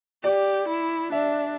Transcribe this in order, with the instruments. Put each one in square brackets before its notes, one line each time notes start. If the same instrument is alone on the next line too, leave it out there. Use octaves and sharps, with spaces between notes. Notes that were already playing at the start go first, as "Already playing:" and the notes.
[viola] G4 [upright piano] D5
[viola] E4
[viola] D4 [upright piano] E5